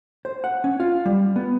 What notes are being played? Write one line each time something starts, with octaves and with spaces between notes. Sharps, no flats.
C5
F#5
C#4
F4
G3
B3